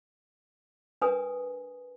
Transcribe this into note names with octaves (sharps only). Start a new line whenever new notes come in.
D4 A#4 B4 G#5 D#6